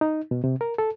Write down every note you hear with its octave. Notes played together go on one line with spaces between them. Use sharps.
D#4
B2
C3
A#4
A4